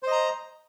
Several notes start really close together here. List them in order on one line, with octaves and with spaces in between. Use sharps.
C5 D#5 A#5